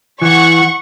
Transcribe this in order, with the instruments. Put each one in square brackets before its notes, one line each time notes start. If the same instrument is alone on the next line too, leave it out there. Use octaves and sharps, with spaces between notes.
[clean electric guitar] E3 [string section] F#5 C#6